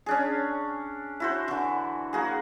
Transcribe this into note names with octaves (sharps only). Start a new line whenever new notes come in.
C#4 D4 G#4
E4 F#4 C5
D3 E3
A#3 F#4 G#4